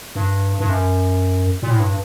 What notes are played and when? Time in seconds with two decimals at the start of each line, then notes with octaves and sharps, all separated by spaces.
0.15 G2
0.60 G2
0.69 F#2
1.62 A#2
1.70 A2
1.80 G2